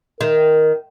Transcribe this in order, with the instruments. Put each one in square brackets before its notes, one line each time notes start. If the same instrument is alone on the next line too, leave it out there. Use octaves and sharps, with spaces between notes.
[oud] D#3 [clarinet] A#4